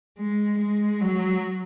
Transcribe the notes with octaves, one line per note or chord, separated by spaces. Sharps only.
G#3
G#3
F#3